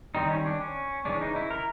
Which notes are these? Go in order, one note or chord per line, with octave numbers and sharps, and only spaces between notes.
D#3 G3 C4 D#4
C#4
D4
C#4
C#3 E3 G#3 C#4 D4
D#4
E4
A#4